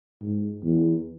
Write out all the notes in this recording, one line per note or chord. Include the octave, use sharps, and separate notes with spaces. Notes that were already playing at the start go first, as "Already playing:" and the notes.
G#2
E2